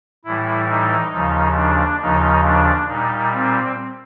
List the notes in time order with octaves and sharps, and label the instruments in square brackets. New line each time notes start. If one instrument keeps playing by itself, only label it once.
[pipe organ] A2 E3 G3 E4
D#4
D#2 C#3 F3
D4
D#2 C#3 F3 D#4
D4
A#2 G3 D#4
C4